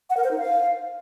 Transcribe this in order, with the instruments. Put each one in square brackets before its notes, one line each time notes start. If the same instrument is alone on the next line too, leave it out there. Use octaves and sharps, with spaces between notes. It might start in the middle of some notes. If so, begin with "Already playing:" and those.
[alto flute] F#5
A#4
C5
D#4
F5